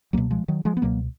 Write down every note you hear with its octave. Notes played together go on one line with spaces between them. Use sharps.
C#2 B2 F#3 A#3
F3 G#3
D#3 F#3
F3 G#3
B3
C#2 B2 F#3 A#3